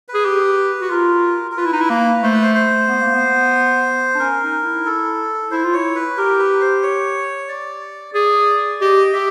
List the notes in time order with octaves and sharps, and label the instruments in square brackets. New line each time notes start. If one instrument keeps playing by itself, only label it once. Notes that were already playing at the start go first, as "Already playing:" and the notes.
[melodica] B4
[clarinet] G#4
G4
F#4
[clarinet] F4 [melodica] A#4
[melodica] A#4
[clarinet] F4 [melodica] B4
[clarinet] E4
D#4
E4
A#3
[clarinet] A3 [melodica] C5
[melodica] B4
C5
C5
[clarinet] B3
A#3
B3
D4
[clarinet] C#4 [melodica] A#4
[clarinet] D#4
E4
[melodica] A4
[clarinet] E4 [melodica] C5
[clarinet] F4
[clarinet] E4 [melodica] C#5
[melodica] B4
[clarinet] G4 [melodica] A#4
[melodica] B4
C5
C#5
D5
[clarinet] G#4 [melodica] D5
[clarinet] G4 [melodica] D#5
[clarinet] G4 [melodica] E5